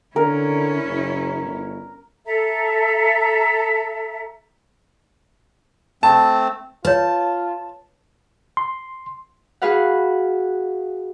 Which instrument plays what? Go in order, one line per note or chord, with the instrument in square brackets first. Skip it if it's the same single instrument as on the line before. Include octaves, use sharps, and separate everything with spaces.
[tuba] D3 [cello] C#4 E4 [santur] A#4
[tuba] F#1
G1
[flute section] A4 E5 A#5
[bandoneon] A3 C4 [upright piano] A5
[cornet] F4 [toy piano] B4 C#5 [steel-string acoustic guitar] A5
[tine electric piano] C6
[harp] F#4 G#4 B4 F5 F#5